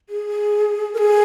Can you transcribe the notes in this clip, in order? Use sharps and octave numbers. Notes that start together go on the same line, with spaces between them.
G#4
A#4
G#4